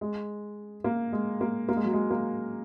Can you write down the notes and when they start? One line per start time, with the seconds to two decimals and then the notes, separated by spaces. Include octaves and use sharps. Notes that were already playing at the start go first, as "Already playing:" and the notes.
0.01 G#3
0.84 A#3
1.13 G#3
1.41 A#3
1.69 A#3
1.77 G#3
1.85 F#3
1.93 G#3
2.11 A#3